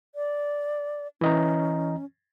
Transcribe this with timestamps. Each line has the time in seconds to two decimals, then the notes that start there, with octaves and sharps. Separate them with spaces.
0.15 D5
1.21 E3 C#4 D#5 A#5